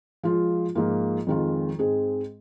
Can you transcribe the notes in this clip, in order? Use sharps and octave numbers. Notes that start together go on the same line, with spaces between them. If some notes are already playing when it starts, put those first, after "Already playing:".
F3 G#3 F4
G#2 F3 A#3 F4
F2 D#3 G#3 F4
G#2 G#3 C4 G#4